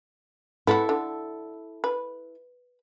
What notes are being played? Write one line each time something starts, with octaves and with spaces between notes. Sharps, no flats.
B3 E4 F#4 A4
D3
B4